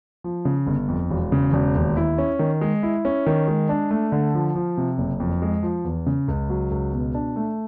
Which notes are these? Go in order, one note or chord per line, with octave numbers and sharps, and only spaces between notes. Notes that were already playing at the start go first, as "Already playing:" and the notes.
F3
C#3
G1
F2
E1
C#3
E1
D#2
E4
C#4
D#3
G#3
E4
C#4
D#3
G#3
D4
A3
D3
F3
F3
C3
F#1
F2
G#3
F3
E2
C#3
C#2
F#3
C#2
B2
D4
A3